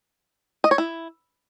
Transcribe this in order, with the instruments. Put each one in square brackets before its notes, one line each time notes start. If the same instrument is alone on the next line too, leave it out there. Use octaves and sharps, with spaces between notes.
[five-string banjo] D#5
C#5
E4